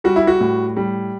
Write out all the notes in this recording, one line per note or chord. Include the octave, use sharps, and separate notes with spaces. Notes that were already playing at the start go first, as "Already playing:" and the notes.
G3 F#4
E4
F#4
A2
G3